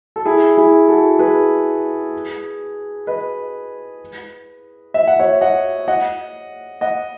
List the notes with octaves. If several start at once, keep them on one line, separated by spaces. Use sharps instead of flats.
A4
E4 G#4
E4 G#4
F#4 A4
G#4 B4
B4 D#5
E5
F#5
C#5 E5
D#5 F#5
D#5 F#5
D#5 F#5